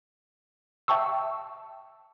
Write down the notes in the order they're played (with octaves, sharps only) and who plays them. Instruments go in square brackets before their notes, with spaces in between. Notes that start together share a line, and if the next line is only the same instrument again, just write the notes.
[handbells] E5 G5 A5 C#6 E6